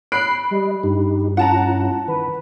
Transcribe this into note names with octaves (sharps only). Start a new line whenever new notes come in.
B5 F#6 C7 D7
G3 D#5
G2 D#4 G4
C#4 E4 F4 F#5 A5 A#5
D#3 B4